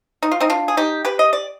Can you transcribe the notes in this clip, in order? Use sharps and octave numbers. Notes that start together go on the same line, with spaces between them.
D#4
F4
C4 D#4
D4 F4
G#4
D#4 G4
G4 B4
D#5
D5